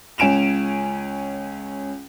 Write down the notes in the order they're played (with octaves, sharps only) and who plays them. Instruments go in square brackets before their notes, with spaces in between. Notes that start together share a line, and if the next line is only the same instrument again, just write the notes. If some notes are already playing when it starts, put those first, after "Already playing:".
[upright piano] C#2 C#4 G#5 D7 E7 F7